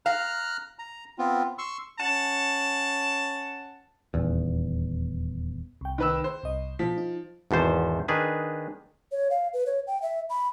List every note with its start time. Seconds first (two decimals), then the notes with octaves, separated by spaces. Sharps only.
0.06 F5 A#5 F6 F#6
0.79 A#5
1.18 B3 C4 F4
1.58 C6 C#6 E6
1.99 C#4 F#5 A5
4.14 D#1 E2
5.81 C2 G5
5.98 D#3 B4 E6
6.24 C5
6.43 C2 D#5
6.79 B2 F3 B6
6.98 D#4
7.51 G#1 E2 B2 C5 A5
8.08 D#3 D4 G#4 B4
9.12 C#5
9.30 F5
9.53 B4
9.66 C#5
9.87 G5
10.02 E5
10.30 B5